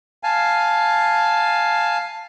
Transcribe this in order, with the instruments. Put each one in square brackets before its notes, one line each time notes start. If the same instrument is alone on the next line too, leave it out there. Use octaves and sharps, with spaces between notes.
[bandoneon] F5 G#5 A5